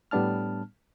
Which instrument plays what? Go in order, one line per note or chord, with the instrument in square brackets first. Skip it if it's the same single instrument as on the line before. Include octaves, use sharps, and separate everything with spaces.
[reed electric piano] A2 G3 B3 D4 A5 F6